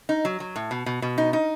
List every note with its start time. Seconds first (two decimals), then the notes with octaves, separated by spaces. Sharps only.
0.09 D#4
0.25 F#3
0.40 F#3
0.56 A2
0.71 B2
0.86 B2
1.02 B2
1.18 D#4
1.33 D#4